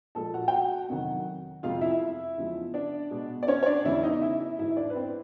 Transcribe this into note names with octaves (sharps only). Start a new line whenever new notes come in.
A#2 F3 G#3 A4 A5
F#4 F#5
G5
F#4 F#5
F2 C3 D#3 F#3
F2 C3 F3 G#3 F4 F5
E4 E5
E2 C#3 F3 G#3
D4 D5
B2 G#3
D5
C#4 C#5
C#5
D4 D5
E2 C#3 E3 G#3 E4 E5
D#4 D#5
E4 E5
E4 E5
G#2 E3 G#3 E4 E5
D4 D5
B4
C4 C5